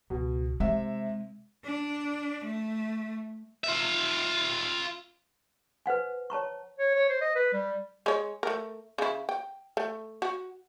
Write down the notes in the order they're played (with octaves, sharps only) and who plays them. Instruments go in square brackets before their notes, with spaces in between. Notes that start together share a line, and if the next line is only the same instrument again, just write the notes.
[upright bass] C#2 [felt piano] B2
[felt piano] C3 E5 [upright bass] G#3
[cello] D4
A3
[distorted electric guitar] F4 E5
[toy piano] B4 C5 F#5 G#5
C#5 A5 A#5 C#6
[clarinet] C#5
C#5
C5
D#5
B4
G3
[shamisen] G#3 C#5
A3 A#4
C#3 E4
G5
A3
F#4